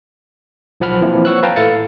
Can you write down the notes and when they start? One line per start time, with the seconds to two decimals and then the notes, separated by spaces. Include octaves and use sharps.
0.80 B1 F3 F#5 B5 F6
1.01 E3 F3 A#3 C4 E4
1.25 C#5 F#5 C#6 E6 F#6
1.43 B4 F5 G5 A5 A#5
1.56 A2 E4 A4 F5 A6 C#7